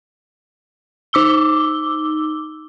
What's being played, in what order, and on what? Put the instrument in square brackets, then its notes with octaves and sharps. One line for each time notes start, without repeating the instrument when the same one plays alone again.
[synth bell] D#4 D6 E6 G7